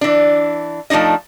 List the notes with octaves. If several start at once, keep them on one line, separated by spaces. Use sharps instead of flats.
E3 D4
F3 A3 D4 D#4 D#5